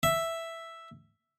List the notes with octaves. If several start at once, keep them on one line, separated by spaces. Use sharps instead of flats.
E5